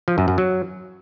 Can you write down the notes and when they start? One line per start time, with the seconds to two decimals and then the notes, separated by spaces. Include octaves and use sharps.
0.08 F3
0.18 F#2
0.28 F#2
0.38 F#3